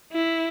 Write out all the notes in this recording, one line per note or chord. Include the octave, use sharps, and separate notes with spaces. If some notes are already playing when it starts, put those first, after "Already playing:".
E4